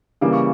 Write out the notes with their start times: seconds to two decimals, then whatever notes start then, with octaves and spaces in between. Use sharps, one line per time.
0.21 C#3 E3 G3 A#3 D6
0.33 C#6